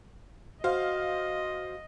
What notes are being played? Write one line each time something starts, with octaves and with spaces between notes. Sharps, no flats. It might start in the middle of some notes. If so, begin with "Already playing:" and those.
F#4 C5 D#5 F5